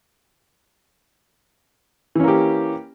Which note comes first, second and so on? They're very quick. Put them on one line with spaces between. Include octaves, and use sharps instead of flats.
E3 C#4 A#3 G4